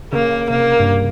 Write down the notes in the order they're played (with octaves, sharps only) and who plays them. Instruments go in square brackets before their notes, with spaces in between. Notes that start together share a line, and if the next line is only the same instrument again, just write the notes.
[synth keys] C#3 [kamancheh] A#3
[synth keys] C3 [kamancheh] A#3
[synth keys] G2